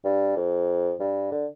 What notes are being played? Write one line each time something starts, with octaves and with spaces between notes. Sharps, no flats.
G2
F2
G2
D3